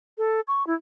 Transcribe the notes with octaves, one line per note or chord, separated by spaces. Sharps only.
A4
C#6
E4